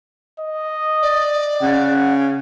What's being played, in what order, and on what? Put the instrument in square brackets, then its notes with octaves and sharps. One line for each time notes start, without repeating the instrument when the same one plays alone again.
[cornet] D#5
[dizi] D5
[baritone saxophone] C#3 [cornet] F#5